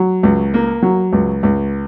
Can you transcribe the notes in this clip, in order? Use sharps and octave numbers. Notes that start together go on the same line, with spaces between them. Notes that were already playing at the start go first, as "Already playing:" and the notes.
Already playing: F#3
C#2
A#3
F#3
C#2
C#2